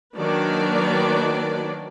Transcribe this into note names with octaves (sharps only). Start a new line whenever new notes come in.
D#3 F#3 A#3 D4 B4 D5